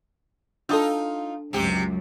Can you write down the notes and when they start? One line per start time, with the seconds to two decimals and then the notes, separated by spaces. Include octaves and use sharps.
0.69 D4 D#4 F4 A4 D#6 E6
1.53 C#2 F#2 C3 G4